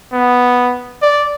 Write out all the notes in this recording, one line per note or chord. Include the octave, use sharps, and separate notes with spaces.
B3
D5